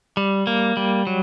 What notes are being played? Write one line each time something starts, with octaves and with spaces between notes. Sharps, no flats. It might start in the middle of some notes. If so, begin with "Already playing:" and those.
G3
A#3
G3
F#3